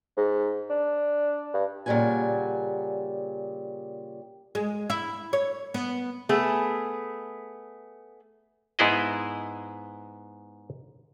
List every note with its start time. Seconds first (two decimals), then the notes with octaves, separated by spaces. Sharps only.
0.17 G#2
0.70 D4
1.54 G2
1.86 A#2 C#3 F3 G3 F#5 G#5
4.55 G#3
4.90 E4
5.33 C#5
5.74 B3
6.29 A3 B3 G#4
8.79 G#2 B3 E4 G#4 D#5